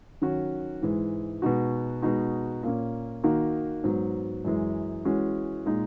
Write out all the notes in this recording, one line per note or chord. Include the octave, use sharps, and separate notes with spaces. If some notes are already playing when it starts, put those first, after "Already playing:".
D#3 F#3 C#4 F#4
G#2 E3 G#3
B2 G#3 D#4 F#4
B2 G#3 D#4 F#4
A#2 A#3 C#4
D#3 A#3 D#4 F#4
G#2 F#3 B3
F#2 E3 G#3
E3 G#3 C#4 F#4
A#2 G#3 D#4